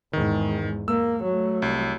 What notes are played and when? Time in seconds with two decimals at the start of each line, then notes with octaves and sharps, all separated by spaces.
0.13 E2 G#2 D#3
0.88 A#3 E6
1.24 F#3 A3
1.62 C2